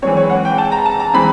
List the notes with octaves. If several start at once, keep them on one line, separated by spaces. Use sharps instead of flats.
E3 G#3 C4 C#5
C#5
F#5
G5
A5
A#5
A5
A#5
E3 G#3 C4 B5